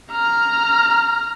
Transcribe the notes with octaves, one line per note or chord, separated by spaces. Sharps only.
A#5 F6